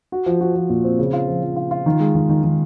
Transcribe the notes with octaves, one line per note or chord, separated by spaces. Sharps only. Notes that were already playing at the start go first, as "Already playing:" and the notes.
F#4
F3
F#4
F3
A#2
C4
C#3
F4
F3
F3
F4
F4
D#3
G#3
D#3
D#3
D#3